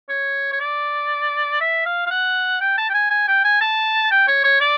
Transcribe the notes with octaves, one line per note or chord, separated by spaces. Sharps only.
C#5
C#5
D5
E5
F5
F5
F#5
G5
A5
G5
G#5
G#5
G5
G#5
A5
G5
C#5
C#5
D5